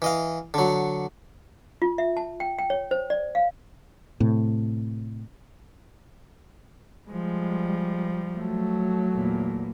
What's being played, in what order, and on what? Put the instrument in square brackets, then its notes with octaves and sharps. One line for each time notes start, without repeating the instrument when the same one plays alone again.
[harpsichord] E3 D#5 F5
D3 F#3
[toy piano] F4
E5
A5
G5
G5
C#5
C5
D5
F5
[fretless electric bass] A2 C3
[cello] F3 G3 [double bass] G#3
[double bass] F#3 A3
[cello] E2 A#2